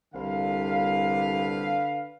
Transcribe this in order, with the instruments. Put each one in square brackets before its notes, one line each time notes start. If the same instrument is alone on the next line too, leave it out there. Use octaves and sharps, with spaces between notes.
[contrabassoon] C2 [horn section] D3 B4 F5